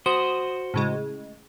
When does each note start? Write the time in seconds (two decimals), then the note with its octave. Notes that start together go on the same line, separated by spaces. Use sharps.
0.06 F#4 C5 D#6
0.74 A2 C#3 G#3